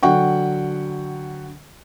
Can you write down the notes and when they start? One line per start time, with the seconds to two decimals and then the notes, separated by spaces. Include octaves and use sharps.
0.03 D3 F#3 F#5 G5 C#6